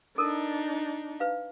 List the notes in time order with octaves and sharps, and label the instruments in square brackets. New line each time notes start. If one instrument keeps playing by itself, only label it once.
[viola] D4 D#4 [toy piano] A4 A#4
[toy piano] B4 F5